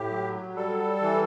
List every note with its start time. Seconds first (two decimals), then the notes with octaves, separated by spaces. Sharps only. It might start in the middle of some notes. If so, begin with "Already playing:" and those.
Already playing: A2 G4
0.10 F#3
0.56 G3 A4
1.02 E3